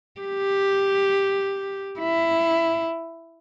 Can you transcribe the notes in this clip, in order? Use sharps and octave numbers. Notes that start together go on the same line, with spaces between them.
G4
E4